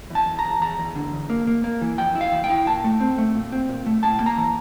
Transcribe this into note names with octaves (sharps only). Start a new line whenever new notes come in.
E2 A5
E2
A#5
E2
E2 A#5
E2
D3
E2
A#3
A#3
A#3
E3
F2 G5
E4
F5
E3
G5
E4
A#2 A5
A3
C4
A3
A#2
C4
A#2
A3
A2 A5
A#3
A#5
E3